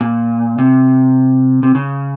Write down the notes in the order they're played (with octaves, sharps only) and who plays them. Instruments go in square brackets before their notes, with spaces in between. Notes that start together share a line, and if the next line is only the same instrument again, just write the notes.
[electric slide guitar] A#2
C3
C3
C#3